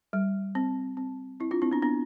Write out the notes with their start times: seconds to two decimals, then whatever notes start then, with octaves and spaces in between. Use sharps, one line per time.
0.13 G3
0.55 C4
0.97 C4
1.40 C4 E4
1.51 D4 F4
1.62 C4 E4
1.71 B3 D4
1.82 B3 D4